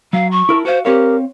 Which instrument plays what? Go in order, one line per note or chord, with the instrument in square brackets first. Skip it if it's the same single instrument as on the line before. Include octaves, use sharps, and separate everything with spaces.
[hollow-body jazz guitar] F#3 [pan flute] F5
[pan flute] C#6
[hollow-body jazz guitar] E4 A#4 A5
[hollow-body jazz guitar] F#4 F5 [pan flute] C5
[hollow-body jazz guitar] C4 C#5 F5 [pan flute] G4 [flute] A#4